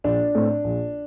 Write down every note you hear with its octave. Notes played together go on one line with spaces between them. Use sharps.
A#1 D4
A2 A3 C4
A#1